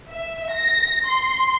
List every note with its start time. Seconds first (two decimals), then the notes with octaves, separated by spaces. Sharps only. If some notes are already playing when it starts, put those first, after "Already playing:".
0.10 E5
0.53 A#6
1.06 C6